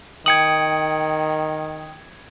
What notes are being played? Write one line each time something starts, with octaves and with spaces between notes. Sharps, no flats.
D#3 G5 D#6 G#6 C#7 F#7